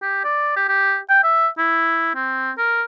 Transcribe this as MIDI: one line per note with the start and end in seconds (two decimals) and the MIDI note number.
0.02 0.20 67
0.24 0.52 74
0.56 0.65 67
0.69 0.98 67
1.09 1.22 79
1.23 1.48 76
1.58 2.12 64
2.15 2.51 60
2.58 2.83 70